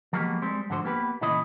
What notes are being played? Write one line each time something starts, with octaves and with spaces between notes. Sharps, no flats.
F3 F#3 G#3 A#3 B3 G4
G3 G#3 C4
G#2 D3 F3 F#4 C5
A#3 B3 G4 A#4 B4
A#2 C#3 E3 E4 D#5 B5